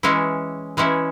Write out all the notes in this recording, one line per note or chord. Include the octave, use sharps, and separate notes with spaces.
E3 G#3 C#4 E4
E3 G#3 C#4 E4